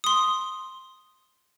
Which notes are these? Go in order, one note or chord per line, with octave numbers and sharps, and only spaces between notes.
C6 D#6